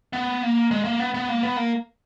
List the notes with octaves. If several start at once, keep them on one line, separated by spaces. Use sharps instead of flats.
B3
A#3
G#3
A#3
B3
B3
A#3
B3
A#3